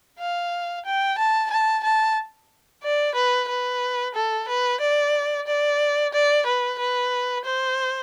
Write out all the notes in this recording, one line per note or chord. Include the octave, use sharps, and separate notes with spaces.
F5
G5
A5
A5
A5
D5
B4
B4
A4
B4
D5
D5
D5
B4
B4
C5